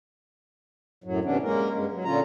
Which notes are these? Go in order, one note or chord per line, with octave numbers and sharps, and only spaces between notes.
F#2 A2 F#3
G2 C3 E3 B3 C#4 D4
G#3 A#3 C#4 A#4
G2 G#3
F#3
A#2 D3 C#4 F4 A#5